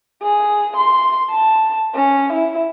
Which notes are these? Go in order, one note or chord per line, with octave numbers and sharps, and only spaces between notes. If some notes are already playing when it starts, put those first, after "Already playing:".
G#4
C6
A5
C#4
E4